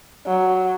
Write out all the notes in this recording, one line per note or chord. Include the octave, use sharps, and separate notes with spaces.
F#3